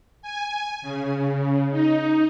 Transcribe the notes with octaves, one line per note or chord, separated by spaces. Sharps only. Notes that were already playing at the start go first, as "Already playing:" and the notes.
G#5
C#3
D#4